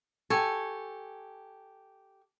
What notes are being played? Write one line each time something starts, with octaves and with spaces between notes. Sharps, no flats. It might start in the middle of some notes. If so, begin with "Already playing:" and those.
G4 A4 G#5 C#6